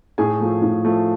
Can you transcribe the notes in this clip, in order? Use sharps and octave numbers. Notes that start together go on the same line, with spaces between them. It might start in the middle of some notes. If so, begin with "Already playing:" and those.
A2 G#4 G#5
F3 A3
A2
F3 A3